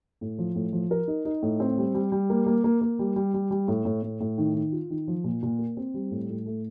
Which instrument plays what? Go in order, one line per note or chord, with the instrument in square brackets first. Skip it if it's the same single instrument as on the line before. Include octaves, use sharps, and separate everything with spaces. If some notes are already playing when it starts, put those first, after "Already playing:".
[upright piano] A2
F3
A2
F3
A#4
D#4
D#4
A2
C4
G3
G3
G3
A#3
A#3
A#3
A#3
G3
G3
G3
G3
A2
A2
A2
A2
D#3
D#3
F4
D#3
F3
A#2
A#2
A#3
C4
G3
A2
A2
A3